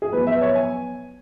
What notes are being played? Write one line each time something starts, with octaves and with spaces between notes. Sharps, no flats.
G#4
B2 F#3 B3 B4
E5
C#5
G#5